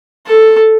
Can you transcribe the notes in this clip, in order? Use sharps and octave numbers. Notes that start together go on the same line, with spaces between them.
A4